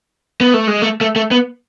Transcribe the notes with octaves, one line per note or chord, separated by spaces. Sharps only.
B3
A3
G#3
A3
A3
A3
B3